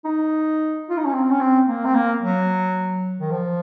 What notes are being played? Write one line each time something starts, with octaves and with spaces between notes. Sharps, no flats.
D#4
F4
D#4
C#4
C4
C#4
C4
A#3
C4
A#3
F#3
D#3
F3